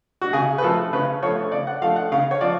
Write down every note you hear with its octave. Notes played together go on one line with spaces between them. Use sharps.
F#4
C#3 G#4
B4
F3 A3 A4
C#3 B4
F3 A3 C#5
C#3 D5
F#5
F3 A3 F5
F#5
C#3 F5
C#5
F3 D5